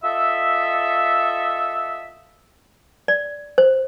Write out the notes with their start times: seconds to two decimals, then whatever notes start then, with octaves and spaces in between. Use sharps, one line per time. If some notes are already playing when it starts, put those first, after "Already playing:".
0.04 F4 A4 D#5 E5
3.08 D5
3.58 C5